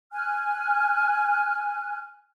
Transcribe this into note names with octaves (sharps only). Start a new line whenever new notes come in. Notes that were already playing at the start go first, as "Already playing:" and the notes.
G#5 F6 F#6